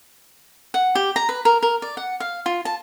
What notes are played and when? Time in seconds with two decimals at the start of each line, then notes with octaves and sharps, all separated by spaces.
0.74 F#5
0.95 G4
1.16 A#5
1.29 B4
1.45 A#4
1.63 A#4
1.82 D5
1.97 F#5
2.20 F5
2.46 F4
2.65 A5